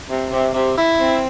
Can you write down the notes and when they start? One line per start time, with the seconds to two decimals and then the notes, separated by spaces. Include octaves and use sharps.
0.09 C3
0.32 C3
0.54 C3
0.77 E4
1.00 C4